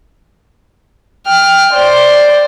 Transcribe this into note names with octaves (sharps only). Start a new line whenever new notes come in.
G5 F6
C5 D5 C6